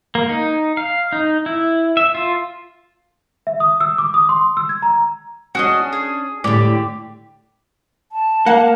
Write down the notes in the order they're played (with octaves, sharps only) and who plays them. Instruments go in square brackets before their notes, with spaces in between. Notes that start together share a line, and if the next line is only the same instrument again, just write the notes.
[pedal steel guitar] A#3
D#4
F5
D#4
E4
E5
F4
[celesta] E5
D#6
E6
D6
D#6
C6
E6
G#6
A#5
[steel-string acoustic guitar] C#4 D4 [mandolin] F#4 G#4 D#5
[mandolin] G#4
[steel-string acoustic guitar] A2 D3 [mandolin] G4 D5
[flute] A5
[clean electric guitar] A#3 [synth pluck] F#5